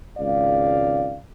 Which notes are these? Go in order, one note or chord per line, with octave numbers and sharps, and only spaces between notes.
G#1 C#2 D5 F5